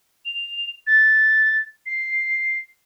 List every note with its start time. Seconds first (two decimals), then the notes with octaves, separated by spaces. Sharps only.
0.25 F7
0.87 A6
1.86 C7